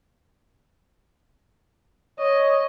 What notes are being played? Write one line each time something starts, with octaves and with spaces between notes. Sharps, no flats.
C#5 D#5